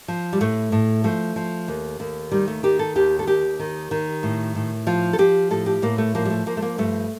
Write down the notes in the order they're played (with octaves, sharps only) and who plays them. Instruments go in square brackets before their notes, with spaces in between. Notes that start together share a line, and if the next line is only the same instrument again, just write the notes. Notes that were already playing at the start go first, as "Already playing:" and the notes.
[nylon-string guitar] F3
G3
A2 A3
A2
F3 A3
F3
D#2
D#2
D#3 G3
A3
D#3 G4
A4
D#2 G4
A4
D#2 G4
D#3
D#3
A2
A2
F3 F4
A4
F3 G4
A2 A4
G4
A2 A#3
A3
F3 A#3
G3
A3
F3 A#3
A3
A#3
G2 A3